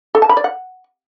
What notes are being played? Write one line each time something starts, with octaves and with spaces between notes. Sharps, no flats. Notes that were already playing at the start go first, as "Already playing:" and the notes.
A4
A5
B5
D5
F#5